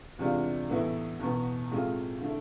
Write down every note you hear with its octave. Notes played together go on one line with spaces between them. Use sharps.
E2 C3 G#3 D4 F4
A2 E3 B3 E4
E2 B2 B3
A2 G#3 C4 F4
D3 A3 E4